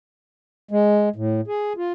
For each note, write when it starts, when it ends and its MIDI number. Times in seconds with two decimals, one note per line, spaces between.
0.71 1.09 56
1.16 1.41 45
1.48 1.73 68
1.77 1.93 65